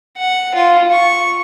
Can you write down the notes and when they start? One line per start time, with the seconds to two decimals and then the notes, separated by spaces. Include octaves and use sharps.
0.18 F#5
0.55 F4
0.92 C#6